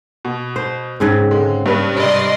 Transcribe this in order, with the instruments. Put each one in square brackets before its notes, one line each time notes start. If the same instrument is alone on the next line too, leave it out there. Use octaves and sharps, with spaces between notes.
[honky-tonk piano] B2
[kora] C5
G#2 C#3 C4
[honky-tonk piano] D3 G#3
G2 B4
[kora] C3 [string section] D5 D#5 C6